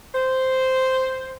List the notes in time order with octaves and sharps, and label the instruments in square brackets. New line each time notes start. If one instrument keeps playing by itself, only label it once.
[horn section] C5